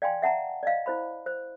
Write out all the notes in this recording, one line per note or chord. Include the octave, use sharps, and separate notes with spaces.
D5 F5 G5 G#5 C6
E5 F#5 A5 A#5
D5 D#5 F5
E4 C5 B5
C5